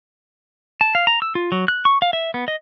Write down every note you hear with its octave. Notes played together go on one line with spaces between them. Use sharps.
A5
F5
A#5
E6
F4
F#3
F#6
C#6
F5
E5
B3
D#5